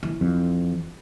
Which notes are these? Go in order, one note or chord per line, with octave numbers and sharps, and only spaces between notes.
E3
F2